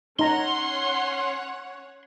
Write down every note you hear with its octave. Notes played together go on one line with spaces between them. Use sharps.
C#4 D#4 C#5 F#5 A#5 C6